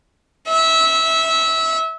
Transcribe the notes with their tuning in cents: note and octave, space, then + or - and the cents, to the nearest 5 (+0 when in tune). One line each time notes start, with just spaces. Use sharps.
E5 -20